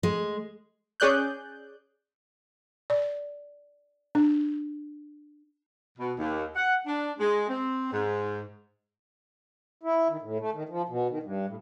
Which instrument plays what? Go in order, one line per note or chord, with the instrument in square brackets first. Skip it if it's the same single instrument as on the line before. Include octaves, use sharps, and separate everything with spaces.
[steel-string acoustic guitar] G#3
[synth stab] C#4 G#4 D5 F#6 G6
[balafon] D5
D4
[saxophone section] B2
D#2
F#5
D4
G#3
C4
G#2
[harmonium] E4
D#3
A2
A3
D#3
F3
B2
D#3
G2
A2